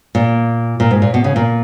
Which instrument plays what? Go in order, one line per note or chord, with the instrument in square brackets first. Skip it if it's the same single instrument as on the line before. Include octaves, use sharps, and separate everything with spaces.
[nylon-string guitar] A#2
A#2
G#2
A#2
B2
C#3
A#2